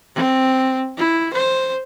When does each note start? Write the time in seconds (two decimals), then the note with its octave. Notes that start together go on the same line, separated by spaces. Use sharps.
0.15 C4
0.97 E4
1.33 C5